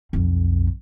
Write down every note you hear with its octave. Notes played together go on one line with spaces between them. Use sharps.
B1 F2